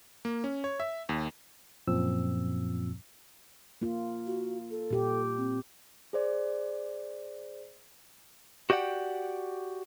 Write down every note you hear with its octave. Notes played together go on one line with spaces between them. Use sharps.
A#3
C#4
C#5
E5
D#2
F#2 A#2 F3 C4 E6
A#3 F4
F#4
A4
A#2 G4
C4
G#4 C5 D5
F#4 G4 D5 D#5 F#5 G5